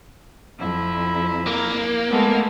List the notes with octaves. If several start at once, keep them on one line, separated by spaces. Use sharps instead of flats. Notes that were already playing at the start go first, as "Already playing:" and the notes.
F2 E4
A#3
G#3 A3 B3